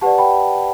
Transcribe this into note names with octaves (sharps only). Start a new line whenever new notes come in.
G4 B4 D5 F#5 A5
G5 B5